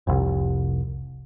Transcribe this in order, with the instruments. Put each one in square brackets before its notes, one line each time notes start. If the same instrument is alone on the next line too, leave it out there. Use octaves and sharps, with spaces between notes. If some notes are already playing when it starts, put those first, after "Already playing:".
[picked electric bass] F1 C2